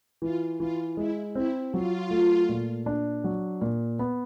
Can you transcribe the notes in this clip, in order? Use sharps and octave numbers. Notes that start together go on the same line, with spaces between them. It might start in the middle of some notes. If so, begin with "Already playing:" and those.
E3 F4
E3 F4
G#3 E4
C4 E4
F#3 F4
A3
A#2
D4
F#3
A#2
B3